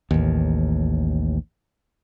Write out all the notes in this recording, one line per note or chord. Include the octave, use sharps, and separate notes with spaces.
A1 D#2